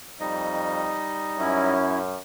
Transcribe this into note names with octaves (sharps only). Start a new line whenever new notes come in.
F2 G3 D#4 D#5
F#2 C#4 E4